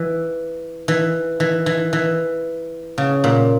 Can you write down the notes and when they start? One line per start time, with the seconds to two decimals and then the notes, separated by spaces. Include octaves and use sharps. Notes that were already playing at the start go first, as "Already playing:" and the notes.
Already playing: E3
0.88 E3
1.40 E3
1.66 E3
1.93 E3
2.98 C#3
3.24 A#2